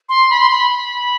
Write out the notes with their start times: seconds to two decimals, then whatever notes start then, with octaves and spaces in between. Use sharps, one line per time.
0.09 C6
0.30 B5
0.40 C6
0.51 B5